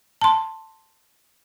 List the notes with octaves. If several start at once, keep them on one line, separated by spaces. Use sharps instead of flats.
A5 C6